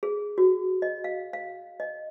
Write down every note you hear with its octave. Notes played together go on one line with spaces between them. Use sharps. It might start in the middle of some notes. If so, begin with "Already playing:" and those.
G#4
F#4
D#5
F5
F5
D#5